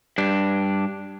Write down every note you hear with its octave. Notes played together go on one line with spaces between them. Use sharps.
G2 D4